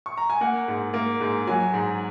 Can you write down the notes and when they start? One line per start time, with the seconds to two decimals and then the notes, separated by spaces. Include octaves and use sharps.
0.06 C#6
0.18 A#5
0.30 G#5
0.41 A#3 F#5
0.68 G#2
0.94 A#3
1.21 G#2
1.47 F#3 G#5
1.74 G#2